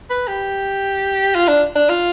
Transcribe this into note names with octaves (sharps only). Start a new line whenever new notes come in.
B4
G4
F4
D4
D4
F4